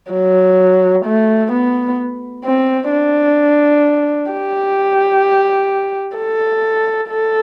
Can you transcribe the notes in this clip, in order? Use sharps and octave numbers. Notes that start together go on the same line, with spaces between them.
F#3
A3
B3
C4
D4
G4
A4
A4